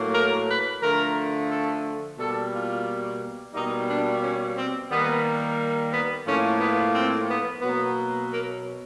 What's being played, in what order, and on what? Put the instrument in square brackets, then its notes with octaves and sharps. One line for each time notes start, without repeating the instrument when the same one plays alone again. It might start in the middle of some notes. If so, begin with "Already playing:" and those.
Already playing: [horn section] A2 F#3 A#3
A#4
B4
D3 F3 A3 A#4
A4
B2 G3 A#3 A4
F4
B2 G3 A#3 D#4
D4
C#4
C4
D#3 G3 A#3 B3
B3
A2 F3 A#3 C#4
B3
C4
B3
B2 F#3 A#3 B3
A#3